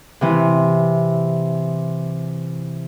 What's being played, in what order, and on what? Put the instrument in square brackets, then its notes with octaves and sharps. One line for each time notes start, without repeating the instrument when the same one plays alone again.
[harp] C3 E3